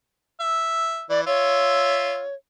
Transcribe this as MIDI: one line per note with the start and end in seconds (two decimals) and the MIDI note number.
0.40 1.04 76
1.10 1.25 52
1.10 1.21 74
1.27 2.23 65
1.27 2.35 73
1.27 2.23 76